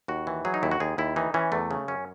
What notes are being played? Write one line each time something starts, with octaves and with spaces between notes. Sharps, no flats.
D#2 F#4
E3
F#3 G#4
D#4
D#2 E4
F#4
D#2 G#4
D#2 E4
E3 D#4
E3 C#4
E2 A3
C#3
F#2 C#4